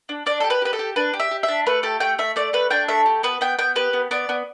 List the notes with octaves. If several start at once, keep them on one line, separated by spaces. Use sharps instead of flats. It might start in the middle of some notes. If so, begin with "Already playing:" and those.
D4
D4 D5
G4 A4
B4
G4 B4
A4
G4
D4 B4
G4
E5
G4
E5
D4
A3 B4
G4 A4
A3 G5
A3 E5
A3 D5
A3 B4
D4 G5
A3 E5
G4
B3 B4
B3 G5
B3 G5
G4 B4
B3
B3 D5
B3